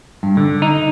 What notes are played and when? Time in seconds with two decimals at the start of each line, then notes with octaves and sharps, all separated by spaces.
0.23 G2
0.37 D3
0.62 D#4